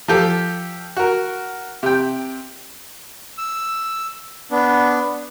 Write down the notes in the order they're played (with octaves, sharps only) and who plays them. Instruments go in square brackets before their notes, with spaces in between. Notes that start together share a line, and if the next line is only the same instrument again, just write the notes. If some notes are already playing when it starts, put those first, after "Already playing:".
[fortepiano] F3 G4 A4
F#4 A#4
C3 G5
[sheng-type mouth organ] E6
B3 D4